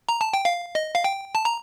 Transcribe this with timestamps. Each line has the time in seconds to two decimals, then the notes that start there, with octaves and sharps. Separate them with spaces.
0.09 A#5
0.21 A5
0.33 G5
0.45 F5
0.75 D#5
0.95 F5
1.04 G5
1.35 A5
1.45 A#5